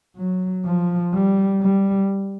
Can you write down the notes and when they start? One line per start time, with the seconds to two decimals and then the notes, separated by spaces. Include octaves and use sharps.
0.17 F#3
0.65 F3
1.14 G3
1.62 G3